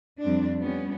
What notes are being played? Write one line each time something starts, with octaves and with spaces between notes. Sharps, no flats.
F2 G3 C4 D4
F3 G3 B3 C#4